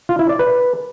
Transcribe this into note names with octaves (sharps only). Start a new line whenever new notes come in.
F4
E4
D5
B4